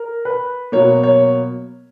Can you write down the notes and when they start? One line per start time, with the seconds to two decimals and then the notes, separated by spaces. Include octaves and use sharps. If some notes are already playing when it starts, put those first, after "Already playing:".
Already playing: A#4
0.25 B4
0.72 B2 F#3 A#3 C#5
1.03 C#5